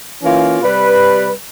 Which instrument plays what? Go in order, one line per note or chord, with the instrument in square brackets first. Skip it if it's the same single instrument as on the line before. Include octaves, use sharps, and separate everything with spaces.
[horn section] E3 A#3 C#4 F4
C3 G3 B4